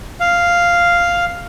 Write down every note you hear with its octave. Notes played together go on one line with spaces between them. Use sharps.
F5